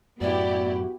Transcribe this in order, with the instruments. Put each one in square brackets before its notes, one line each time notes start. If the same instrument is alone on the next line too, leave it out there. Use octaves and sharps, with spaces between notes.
[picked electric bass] F#2 A2 [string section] B3 E4 G4 [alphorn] F#4 [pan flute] D5